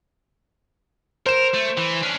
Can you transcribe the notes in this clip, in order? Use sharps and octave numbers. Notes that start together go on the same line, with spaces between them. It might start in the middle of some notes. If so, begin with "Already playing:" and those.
A#4 C5 E7
A3
E3
C#4 D4